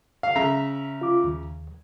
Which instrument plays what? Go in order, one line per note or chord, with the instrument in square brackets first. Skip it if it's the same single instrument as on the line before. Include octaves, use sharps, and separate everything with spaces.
[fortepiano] F5
C#3 E5 A#5
[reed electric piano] F4 D6
D#2